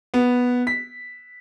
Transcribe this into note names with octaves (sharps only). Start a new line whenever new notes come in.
B3
B6